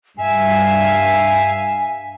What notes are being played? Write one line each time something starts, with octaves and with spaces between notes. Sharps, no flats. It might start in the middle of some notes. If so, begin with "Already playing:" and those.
G2 E5 F5 G#5